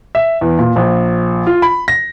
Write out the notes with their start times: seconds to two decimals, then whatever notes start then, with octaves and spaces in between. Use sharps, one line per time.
0.15 E5
0.41 E2
0.59 A#2
0.76 A#1
1.47 F4
1.62 B5
1.88 A#6